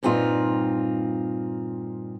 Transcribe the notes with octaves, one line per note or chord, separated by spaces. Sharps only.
G2 A#2 C4 D#4 F4